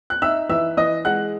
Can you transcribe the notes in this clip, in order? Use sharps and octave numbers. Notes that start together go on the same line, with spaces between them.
F#6
D#4 E5 E6
E3 E5 E6
E3 D#5 D#6
G#3 F#5 F#6